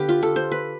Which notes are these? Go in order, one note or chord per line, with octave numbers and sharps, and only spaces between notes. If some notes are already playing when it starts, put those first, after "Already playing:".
Already playing: D3 B3 G4 B4 F5
F4
A4
C5
B4